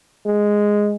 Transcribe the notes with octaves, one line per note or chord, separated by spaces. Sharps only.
G#3